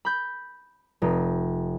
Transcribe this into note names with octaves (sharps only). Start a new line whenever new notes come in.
B5 G6
F1 D#4